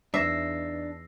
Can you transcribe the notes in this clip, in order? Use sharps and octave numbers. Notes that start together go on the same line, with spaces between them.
E2 D4 D#4 E5 E6 A#6 C7